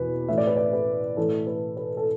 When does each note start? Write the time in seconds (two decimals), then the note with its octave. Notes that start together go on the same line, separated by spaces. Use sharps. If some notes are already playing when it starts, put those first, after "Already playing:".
Already playing: E2 B2 B4
0.28 A2 E3 E5
0.38 D5
0.47 B4
0.56 D5
0.73 B4
1.17 A2 E3 A4
1.47 B4
1.77 B4
1.97 A4